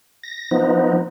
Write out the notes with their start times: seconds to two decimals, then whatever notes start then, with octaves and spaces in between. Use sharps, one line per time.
0.24 A#6
0.51 F3 B3 D#4